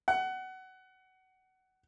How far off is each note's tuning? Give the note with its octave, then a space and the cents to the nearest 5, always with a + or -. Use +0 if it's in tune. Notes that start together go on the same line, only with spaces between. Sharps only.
F#5 +20